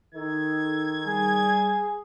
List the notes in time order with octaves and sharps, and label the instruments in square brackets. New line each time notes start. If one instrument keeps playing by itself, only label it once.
[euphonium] D#3 [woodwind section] D#4 A4 [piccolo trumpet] G#6
[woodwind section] G3 [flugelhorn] G#4